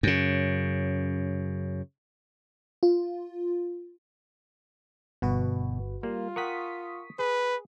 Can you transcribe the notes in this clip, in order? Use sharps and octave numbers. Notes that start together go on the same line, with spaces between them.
F#2 C#3
F4
G1 B2 F#4 B4
G3 A#3 F4
A#4 F#5 G5 C#6 D#6 B6
G#4 B4